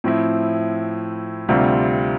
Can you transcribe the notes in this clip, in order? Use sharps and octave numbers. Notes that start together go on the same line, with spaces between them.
A2 F3 C4 E4
D2 C3 G3 C4 F4